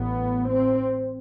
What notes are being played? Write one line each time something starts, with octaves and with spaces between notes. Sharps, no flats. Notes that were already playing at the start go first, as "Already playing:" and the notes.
Already playing: A1 A2 B3
C4